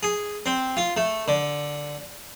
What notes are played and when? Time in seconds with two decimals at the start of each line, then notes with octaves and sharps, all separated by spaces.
0.03 G#4
0.46 C4
0.77 F4
0.97 A3
1.28 D3